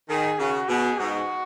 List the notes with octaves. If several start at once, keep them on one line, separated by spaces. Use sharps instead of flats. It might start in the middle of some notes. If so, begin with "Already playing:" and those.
D#3 G#4
C#3 F#4
B2 G#4
G#2 F#4